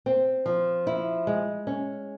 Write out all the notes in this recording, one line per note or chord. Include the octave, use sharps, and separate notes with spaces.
C4
F3
E4
G#3
C#4